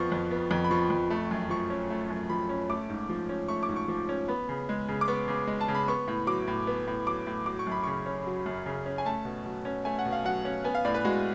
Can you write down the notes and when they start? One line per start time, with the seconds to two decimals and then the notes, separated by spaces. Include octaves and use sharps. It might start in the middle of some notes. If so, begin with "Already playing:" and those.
Already playing: F2 F3 B3 C#6
0.12 F2
0.31 B3
0.51 F2
0.64 B5
0.71 F3 C#6
0.90 F2
1.10 A3
1.31 F#2
1.50 F3 C#6
1.70 C#4
1.90 A3
2.10 F#2
2.30 F3 B5
2.49 C#4
2.69 A3 D6
2.89 G#2
3.09 F3
3.29 C#4
3.48 A3 C#6
3.63 D6
3.69 G#2
3.76 C#6
3.88 F3
4.09 C#4
4.28 B3 B5
4.49 C#3
4.69 G#3
4.88 C#3
5.01 D6
5.08 B3 C#6
5.28 C#3
5.47 G#3
5.61 A5
5.68 C#3
5.75 B5
5.88 B3 C#6
6.08 A2
6.27 F#3 D6
6.48 A2
6.67 B3
6.87 A2
7.07 F#3 D6
7.27 A2
7.46 F#3 D6
7.59 C#6
7.67 F#2 B5
7.84 C#3 C#6
8.06 C#4
8.26 F#3
8.46 F#2
8.66 C#3
8.86 C#4
8.98 G#5
9.06 A3 A5
9.25 B2
9.46 F#3
9.65 C#4
9.85 A3 G#5
9.99 F#5
10.05 B2
10.12 F5
10.24 F#3 F#5
10.45 C#4
10.64 B3 G#5
10.75 F5
10.85 A2 D5
10.94 B4
11.05 G#3 F#4